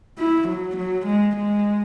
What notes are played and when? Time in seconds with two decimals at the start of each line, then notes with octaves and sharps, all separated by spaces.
0.18 E4
0.49 F#3
0.77 F#3
1.07 G#3
1.36 G#3